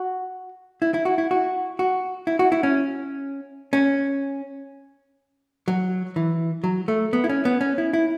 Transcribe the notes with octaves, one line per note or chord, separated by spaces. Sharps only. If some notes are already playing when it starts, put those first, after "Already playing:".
Already playing: F#4
E4
E4
F#4
E4
F#4
F#4
E4
F#4
E4
C#4
C#4
F#3
E3
F#3
A3
B3
E4
C#4
B3
C#4
E4
E4